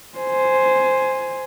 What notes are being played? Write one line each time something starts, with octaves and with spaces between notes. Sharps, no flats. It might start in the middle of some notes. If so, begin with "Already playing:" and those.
C5 G#5